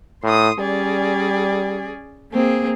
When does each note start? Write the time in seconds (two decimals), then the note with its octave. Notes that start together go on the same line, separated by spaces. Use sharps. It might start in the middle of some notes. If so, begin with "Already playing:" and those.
0.24 A2 C6 D#6
0.59 G3 C#4 G#4 D5
2.32 A#3 C4 G#4